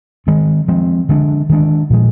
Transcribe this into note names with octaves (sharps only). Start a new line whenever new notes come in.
D#3 G#3 C4
F3 G#3 C4
D3 G#3 D4
D#3 G#3 D4
A#2 F3 G#3